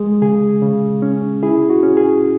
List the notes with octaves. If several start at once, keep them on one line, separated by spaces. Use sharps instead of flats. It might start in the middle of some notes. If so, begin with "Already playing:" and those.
Already playing: G#3 G#4
C#3 G#4
C#3
C#4
E4 G#4
F#4
C#4
G#4